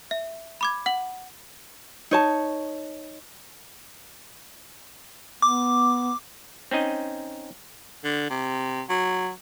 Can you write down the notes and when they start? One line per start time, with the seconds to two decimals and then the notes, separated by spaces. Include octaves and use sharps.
0.11 E5
0.61 B5 D6 G#6
0.86 F#5 F#7
2.11 D#4 C#5 A5
5.42 B3 D6
6.71 C4 C#4 D#4 D#5
8.04 D3
8.30 C3
8.90 F#3